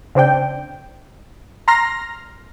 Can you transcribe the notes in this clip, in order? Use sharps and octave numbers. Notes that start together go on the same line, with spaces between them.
C#3 C4 D4 G5
A#5 C6 F6 A#6